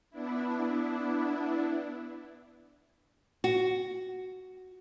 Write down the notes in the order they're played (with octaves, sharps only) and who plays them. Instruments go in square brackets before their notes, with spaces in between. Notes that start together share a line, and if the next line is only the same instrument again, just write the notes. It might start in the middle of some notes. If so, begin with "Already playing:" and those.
[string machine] B3 D4 E4
[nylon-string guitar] F#4